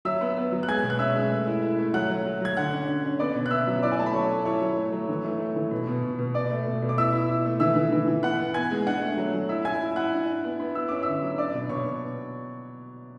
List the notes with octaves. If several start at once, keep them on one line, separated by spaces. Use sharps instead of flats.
F#3 E5 E6
B3
B3
F#3
F#6
G#3 G#5 G#6
B2
F#6
C#4 E5 E6
G#3
A3
E4
E4
A3
F#3 F#5 F#6
F#3
F#3
F#3 G#6
D3 F#5 F#6
C#4
D3
C#4
B3 D5 D6
B2
F#6
B3 E5 E6
F#3
E4 D5 D6
G#5
A3 A5
B5
F#3 C#5 C#6
A3
E4 C#5 C#6
F#3
A3
F#3
E3
A3
A3
E3
B2
B2
B2
B2
B2 D5 D6
A3
B2
B2
D6
E4 E5 E6
E4
E4
A3
E3 E5 E6
E3
E3
E3
B3 F#5 F#6
B3
B3 G#5 G#6
G#3
D4 F#5 F#6
A3
F#3
F#3
E4 E5 E6
E4 G#5 G#6
E4
E4 F#5 F#6
D4
D4
B3
B3
E4 E6
C#4 D6
D3 E5 E6
F#3
D4 D5 D6
B2
B2 C#5 C#6
B2